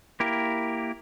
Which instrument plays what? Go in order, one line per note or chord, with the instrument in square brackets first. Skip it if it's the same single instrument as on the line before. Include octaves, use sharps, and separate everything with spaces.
[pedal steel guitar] A#3 E4 G4 A#4